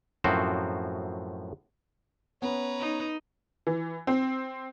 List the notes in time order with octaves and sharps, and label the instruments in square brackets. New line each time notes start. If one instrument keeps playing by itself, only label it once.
[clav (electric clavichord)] F#2 A2 F3 C4 F#4 C5
[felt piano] B3 C#4 [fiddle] B4 A#5 [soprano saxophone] C#5
[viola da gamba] D#4
[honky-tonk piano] E3
C4